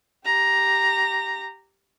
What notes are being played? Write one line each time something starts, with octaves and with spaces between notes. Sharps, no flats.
G4 A#5